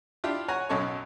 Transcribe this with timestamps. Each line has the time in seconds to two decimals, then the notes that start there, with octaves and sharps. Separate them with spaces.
0.24 D4 E4 F4 G4
0.48 C#5 F#5 G#5 A#5 C#6
0.69 B1 F#2 C#4 D#4 A4 C#6